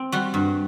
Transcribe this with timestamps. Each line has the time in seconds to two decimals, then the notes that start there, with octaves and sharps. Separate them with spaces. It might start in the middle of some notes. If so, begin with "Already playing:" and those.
Already playing: C4
0.12 G3 F#4
0.34 G2